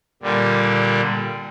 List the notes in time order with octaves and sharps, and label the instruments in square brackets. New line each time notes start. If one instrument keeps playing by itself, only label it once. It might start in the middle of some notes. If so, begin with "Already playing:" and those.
[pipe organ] A#2 D3 G3